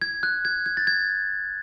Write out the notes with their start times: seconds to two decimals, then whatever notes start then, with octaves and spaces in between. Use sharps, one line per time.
0.02 G#6
0.23 F#6
0.45 G#6
0.66 G#6
0.77 A6
0.87 G#6